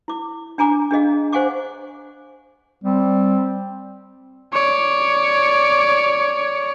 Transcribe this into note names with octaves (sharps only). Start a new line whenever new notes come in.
E4 D6
D4 G#5 A#5 D6
D4 G#4 D#5 F5
C5 F5 F#5 G#5 C#6 D6
G3 C4
C#5 D5